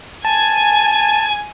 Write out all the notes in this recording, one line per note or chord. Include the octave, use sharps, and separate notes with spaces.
G#5 A5